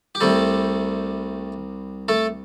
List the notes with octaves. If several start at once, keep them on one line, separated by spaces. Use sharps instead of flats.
G4
C2 C3 G3 A3 A4
A3 A4